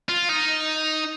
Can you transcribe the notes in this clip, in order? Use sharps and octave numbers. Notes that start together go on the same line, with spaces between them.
F4
D#4